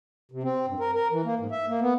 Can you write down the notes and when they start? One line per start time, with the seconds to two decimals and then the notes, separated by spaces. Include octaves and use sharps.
0.32 C3
0.43 C4
0.67 G2
0.80 A#4
0.95 A#4
1.12 E3
1.25 A#3
1.39 G#2
1.51 E5
1.68 A#3
1.80 B3